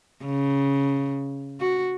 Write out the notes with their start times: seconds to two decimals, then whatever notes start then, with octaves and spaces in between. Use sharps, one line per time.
0.25 C#3
1.60 F#4